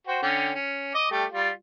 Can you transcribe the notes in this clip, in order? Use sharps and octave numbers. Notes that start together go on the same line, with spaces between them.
F#4 C5 G5
D3 C#4 G5
C#4
D#5 D6
G3 A3 G4
G3 F4